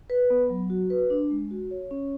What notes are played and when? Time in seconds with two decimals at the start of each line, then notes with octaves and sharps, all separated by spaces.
0.10 B4
0.30 B3
0.50 F#3
0.70 F#4
0.90 B4
1.10 D4
1.31 G#3
1.51 F#4
1.71 C#5
1.91 C#4